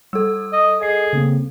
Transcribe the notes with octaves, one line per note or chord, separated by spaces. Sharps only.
G3 A4 E6
D#5
G#4 D#5 C7
C#3 A#3 C4